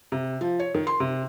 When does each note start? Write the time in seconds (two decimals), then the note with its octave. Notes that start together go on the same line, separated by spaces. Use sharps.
0.12 C3
0.41 F3
0.60 C#5
0.75 D#3
0.87 C6
1.00 C3